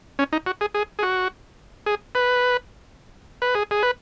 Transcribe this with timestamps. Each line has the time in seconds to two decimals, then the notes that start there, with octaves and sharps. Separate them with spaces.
0.19 C#4
0.33 D#4
0.46 F#4
0.61 G#4
0.74 G#4
0.99 G#4
1.03 F#4
1.86 G#4
2.15 B4
3.42 B4
3.55 G#4
3.71 G#4
3.83 B4